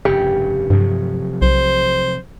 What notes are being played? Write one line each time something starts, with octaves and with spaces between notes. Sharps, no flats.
F1 G2 C#3 G4
G2 C3 F3 F#3
B1 C5